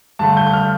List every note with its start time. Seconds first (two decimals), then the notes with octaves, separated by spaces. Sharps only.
0.19 G2 D3 A3 A5
0.37 G6
0.47 G6
0.54 F6